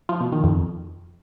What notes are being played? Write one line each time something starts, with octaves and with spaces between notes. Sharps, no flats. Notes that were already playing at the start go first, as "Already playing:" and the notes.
F3
B2
D#3
F2